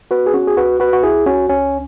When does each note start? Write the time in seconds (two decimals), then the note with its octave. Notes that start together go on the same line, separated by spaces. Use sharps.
0.11 B3 F#4 B4
0.26 G#4
0.34 C#4 F#4
0.47 G#4
0.57 C#2 F#4 B4
0.80 F#4 B4
0.93 F#4
1.03 C#2 E4 G#4
1.26 C#4 F#4
1.49 C#2 C#4